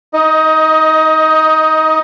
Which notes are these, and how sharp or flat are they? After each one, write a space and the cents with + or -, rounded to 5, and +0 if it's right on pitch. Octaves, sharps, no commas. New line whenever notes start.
D#4 +20 D#5 +0